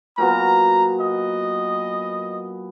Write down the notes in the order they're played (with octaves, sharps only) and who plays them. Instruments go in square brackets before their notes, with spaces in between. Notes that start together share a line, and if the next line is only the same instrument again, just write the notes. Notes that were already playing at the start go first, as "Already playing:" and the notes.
[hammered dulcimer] A#2 F#3 B3 [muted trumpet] A#5
[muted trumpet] D#5